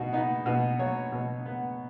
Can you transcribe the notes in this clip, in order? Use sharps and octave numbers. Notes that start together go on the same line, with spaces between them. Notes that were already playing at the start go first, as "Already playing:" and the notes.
Already playing: B2 D#4 F#4
B3 D#4
B2 F#4
F#3 C#5
B2
B3